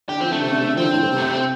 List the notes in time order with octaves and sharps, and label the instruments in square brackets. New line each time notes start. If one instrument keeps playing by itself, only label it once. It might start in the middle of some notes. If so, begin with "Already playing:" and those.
[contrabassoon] D3 [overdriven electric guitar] G4
[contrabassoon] F3 [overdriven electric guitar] C4
[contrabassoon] D3 [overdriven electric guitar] A3
[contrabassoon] C3
D3
C3
D3
[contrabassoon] F3 [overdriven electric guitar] C4
[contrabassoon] D3
A2
G2
C3
[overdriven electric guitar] A3
C4